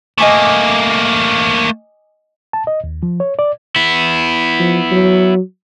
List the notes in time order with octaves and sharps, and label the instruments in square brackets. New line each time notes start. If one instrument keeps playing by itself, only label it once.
[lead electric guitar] A3 A#3 [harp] D#5 G#5 D6
[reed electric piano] A5
D#5
D#2
F3
C#5
D5
[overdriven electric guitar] B3 E4
[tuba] F3
F#3